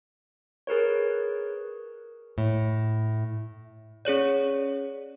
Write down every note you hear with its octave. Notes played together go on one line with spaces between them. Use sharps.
G#4 A#4 B4 C#5
A2
C#4 G#4 C#5 D5